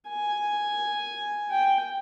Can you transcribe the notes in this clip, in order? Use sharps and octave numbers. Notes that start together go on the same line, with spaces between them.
G#5
G5